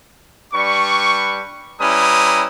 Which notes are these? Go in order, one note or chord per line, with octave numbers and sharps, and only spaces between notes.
G3 D4 B4 C#6
G3 C#4 E4 B4 A#5 D#6